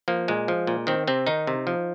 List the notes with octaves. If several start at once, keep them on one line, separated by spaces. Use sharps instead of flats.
F3 A#3
A#2 G#3
F3
A#2
D#3 C4
C3 C4
D#3 D#4
C3
F3